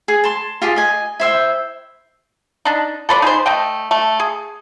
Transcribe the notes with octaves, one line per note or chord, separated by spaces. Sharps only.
G#4
A5 C6
F4 G4 G#4
D#5 G#5
E4 C5 E5 G5
D4 D#4
A4 B4 C5 D5
D#4 G#4 B4 C5
A3 D#5 G5
A3
G#4